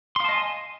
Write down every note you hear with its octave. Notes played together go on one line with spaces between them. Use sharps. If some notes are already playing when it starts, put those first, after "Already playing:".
D#5 F5 G#5 A5 C6